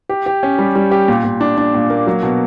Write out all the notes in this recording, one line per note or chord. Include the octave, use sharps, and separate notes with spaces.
G4
G4
C#4
G3
G3
G4
A#2
A#2
D4
D4
A#2
A#3
F#3
B2